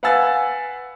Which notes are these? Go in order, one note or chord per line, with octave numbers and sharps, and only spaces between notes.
B4 F5 F#5 G#5 E6 A6